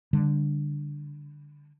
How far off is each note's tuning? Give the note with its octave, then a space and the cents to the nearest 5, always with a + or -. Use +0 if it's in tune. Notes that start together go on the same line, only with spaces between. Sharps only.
D3 +0 G3 +35